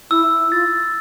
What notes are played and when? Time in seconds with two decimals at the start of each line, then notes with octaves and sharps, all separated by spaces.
0.11 E4 E6
0.51 F4 A6